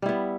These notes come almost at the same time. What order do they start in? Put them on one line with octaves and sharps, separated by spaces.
G3 E4 B3